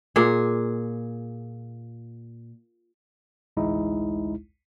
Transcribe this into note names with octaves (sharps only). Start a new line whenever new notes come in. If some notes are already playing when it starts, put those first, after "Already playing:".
A#2 G#4
A1 D2 G#3 D#4 E4